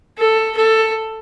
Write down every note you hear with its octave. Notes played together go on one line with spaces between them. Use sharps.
A4
A4